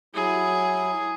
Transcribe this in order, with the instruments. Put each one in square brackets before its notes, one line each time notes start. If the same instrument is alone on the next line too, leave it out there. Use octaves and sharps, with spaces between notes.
[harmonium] F#3 E4 [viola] G#4